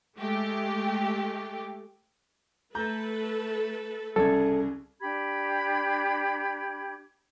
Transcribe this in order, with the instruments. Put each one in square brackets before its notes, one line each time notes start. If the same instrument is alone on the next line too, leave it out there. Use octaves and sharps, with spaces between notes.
[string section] G#3 A3 G4
[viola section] A3 A4 B4 [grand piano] A#5 G6
[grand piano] C2 C#3 G#6 [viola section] G#4 [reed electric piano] A4
[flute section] D4 G4 B5 G#6